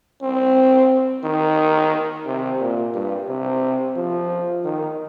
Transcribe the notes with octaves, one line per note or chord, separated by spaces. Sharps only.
C4
D#3
C3
A#2
G2
C3
F3
D#3